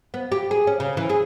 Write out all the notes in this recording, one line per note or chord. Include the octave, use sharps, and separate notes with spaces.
B3
G4
G#4
C#4
C#3
E3
G#4